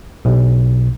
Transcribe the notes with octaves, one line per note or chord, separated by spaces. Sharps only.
B1